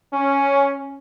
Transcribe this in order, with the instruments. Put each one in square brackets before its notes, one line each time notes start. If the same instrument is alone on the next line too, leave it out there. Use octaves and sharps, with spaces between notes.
[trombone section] C#4